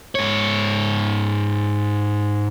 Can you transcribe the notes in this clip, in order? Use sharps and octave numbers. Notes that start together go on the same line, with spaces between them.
G#2 C#5